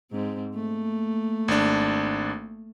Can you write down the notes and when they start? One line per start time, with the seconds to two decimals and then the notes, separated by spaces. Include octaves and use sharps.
0.11 G#2 C4
0.55 A3 A#3
1.48 G#1 D4